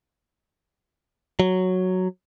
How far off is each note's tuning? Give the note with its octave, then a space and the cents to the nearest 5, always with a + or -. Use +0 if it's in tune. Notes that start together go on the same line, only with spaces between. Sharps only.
F#3 +0